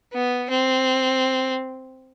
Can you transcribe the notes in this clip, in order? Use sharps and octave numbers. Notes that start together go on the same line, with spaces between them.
B3
C4